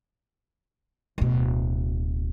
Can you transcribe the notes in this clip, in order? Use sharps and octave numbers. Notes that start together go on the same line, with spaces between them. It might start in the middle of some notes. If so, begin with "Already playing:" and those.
D1 B2